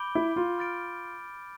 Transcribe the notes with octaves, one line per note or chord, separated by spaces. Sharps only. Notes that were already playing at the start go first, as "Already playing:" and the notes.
Already playing: B5 D6 G6 D7 G7
E4
F4
B5 F6 A6 D7